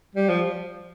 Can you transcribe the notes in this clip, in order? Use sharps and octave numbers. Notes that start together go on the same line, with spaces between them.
G3
F3